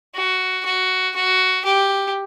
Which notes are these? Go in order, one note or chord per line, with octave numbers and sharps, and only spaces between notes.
F#4
F#4
F#4
G4